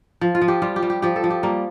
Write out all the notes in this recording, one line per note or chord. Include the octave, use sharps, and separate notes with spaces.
F3
F4
F3
G4
G3 F4
G4
G3
G4
F3 G4
A4
F3
G4
G3 A#3